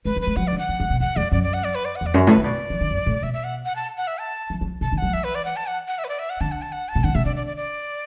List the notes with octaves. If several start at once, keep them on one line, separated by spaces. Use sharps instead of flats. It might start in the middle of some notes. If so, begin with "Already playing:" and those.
A3 B4
F#3
B4
A3
F#3 F#5
D5
D3
F#5
E3
D3
B2
E2 F#5
E2 D5
F#2 D5
D5
F#5
D5
B4
D5
F#5
E2
D5
F#2
A2 B4
D3
B2 D5
E3
D3
F#2
A2
B2 E5
E5
F#5
F#5
A5
F#5
E5
A5
E3
F#3
B2 A5
D3
F#3 F#5
E3 E5
B4
D5
F#5
A5
F#5
F#5
E5
B4
D5
E5
F#5
D3 A5
F#5
A5
F#5
A5
B2
D3 F#5
B2 E5
D3 D5
D5
D5
D5